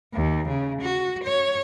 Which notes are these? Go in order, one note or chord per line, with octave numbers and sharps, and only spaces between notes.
D#2
C#3
F#4
C#5